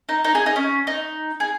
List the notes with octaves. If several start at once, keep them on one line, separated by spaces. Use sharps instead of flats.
D#4
D#4
G#4
D#4
C#4
D#4
G#4